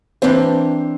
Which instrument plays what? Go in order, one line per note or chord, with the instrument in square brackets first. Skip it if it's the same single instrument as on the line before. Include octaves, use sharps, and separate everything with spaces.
[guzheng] E3 A#3 D4 G4 [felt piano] C4 C5